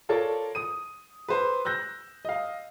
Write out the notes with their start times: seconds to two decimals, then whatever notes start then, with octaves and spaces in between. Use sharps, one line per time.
0.09 F4 A4 A#4 C#5 D5 A5
0.55 D#6 D#7
1.28 B4 C5
1.65 E6 F#6 G6 A#6
2.25 D#5 F5